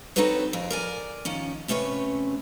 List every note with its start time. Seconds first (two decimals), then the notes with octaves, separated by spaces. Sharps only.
0.16 C4 D#4 F#4 A4 B4 C#5
0.53 F2 G#4
0.70 A#4 D5 G#5
1.25 D#3 F3 C#4
1.68 C3 A3 C#4 B4 C#5